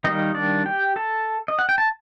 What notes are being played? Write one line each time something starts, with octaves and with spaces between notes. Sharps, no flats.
D#3 G3 A#3 D#4 D#5
D4 D5
G4 G5
A4 A5
D#5
F#5
G5
A5